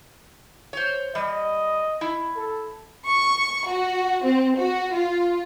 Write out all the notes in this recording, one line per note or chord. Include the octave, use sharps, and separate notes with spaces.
C5 C#5
G3 D#5
E4
A4
C#6
F#4
C4
F#4
F4